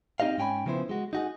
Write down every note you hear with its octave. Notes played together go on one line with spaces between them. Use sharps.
C4 D#4 G4 D#5 F5
G#2 C#4 G5 G#5 B5
C#3 F3 B3 E4 C5
G#3 F#4
D#4 F#4 G#4